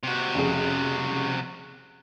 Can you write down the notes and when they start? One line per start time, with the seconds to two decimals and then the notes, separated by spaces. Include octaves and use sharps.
0.03 C3 F#4
0.35 F1 C#3 G#4